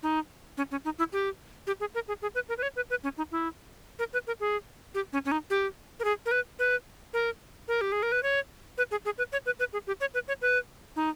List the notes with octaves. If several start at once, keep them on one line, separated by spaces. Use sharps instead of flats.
D#4
C#4
C#4
D#4
E4
G4
G4
G#4
A#4
G#4
G#4
B4
A#4
B4
C#5
B4
B4
C#4
D#4
E4
A#4
B4
A#4
G#4
G4
C#4
C#4
D#4
G4
A#4
G#4
A#4
B4
B4
A#4
A#4
G4
G#4
A#4
B4
C#5
B4
G#4
G#4
B4
C#5
B4
B4
G#4
G4
C#5
B4
C#5
B4
D#4